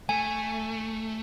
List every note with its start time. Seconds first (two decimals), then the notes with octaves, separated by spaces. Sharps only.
0.09 A3 G#5